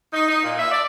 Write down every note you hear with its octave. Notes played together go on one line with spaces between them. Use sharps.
D#4
D#4
A#2
E5
D5